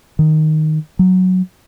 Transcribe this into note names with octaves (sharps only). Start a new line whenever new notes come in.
D#3
F#3